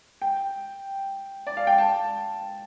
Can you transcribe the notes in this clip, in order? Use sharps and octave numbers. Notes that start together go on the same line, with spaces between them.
G5
D5
F5
G5
A5